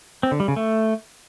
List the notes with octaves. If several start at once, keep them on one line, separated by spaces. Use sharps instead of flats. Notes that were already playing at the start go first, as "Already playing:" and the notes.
C4
D3
G3
C#3
A3